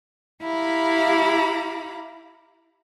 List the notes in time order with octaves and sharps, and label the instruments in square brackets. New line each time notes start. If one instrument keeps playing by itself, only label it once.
[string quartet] E4 G4 F5 A#5 B5